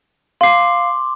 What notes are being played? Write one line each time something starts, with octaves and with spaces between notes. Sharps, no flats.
F5 C6 D6 C7